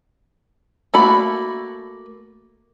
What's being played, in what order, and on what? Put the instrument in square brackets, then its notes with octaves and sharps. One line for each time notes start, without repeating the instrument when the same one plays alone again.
[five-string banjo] A3 A#3 F#4 B5